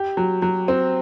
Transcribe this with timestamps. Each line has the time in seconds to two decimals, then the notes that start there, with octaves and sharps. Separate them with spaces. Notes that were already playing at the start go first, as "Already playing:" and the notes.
Already playing: G4
0.17 F#3
0.42 F#3
0.68 C4